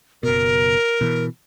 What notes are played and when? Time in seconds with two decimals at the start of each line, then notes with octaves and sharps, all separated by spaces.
0.23 F#1 B2 A#4
1.01 B2 E3